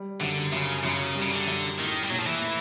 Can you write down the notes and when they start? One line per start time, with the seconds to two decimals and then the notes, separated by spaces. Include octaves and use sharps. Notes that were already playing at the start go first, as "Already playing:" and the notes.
Already playing: G3
0.20 F#2 D3
0.53 F#2 C#3
0.84 F#2 C#3
1.15 G3
1.22 C#3
1.32 D3
1.47 F#2
1.79 A2 D#3
2.03 G3
2.10 A#1 F#3
2.19 F3
2.26 E3
2.42 A2